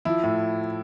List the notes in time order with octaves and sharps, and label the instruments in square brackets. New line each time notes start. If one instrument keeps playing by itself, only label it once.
[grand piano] F3 E4
A2